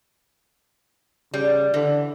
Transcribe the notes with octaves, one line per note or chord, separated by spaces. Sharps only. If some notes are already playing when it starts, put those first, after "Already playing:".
C#3 G3
D3 E3